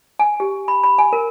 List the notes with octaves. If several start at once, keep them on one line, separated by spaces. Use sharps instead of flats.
G#5
G4
B5
B5
G#5
A#4